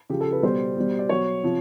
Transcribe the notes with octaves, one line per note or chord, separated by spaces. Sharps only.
C#3 F3 G4
A4
B4
B2 G3 C5
B2 G3
D5
B2 F#3 C#5
C3 F3